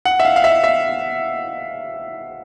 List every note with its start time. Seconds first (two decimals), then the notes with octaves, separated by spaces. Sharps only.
0.05 F#5
0.20 E5
0.25 F5
0.36 F5
0.44 E5
0.64 E5